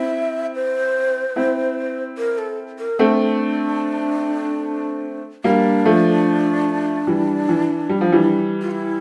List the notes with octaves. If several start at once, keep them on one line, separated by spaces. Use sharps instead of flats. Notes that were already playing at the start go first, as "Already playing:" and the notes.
Already playing: C4 E4 E5
C5
C4 E4
A#4
A4
A#4
A3 C4 D4
G3 A#3 D4
F3 A3
E3 G3
E3
G3
F3
E3 G3
F4
E4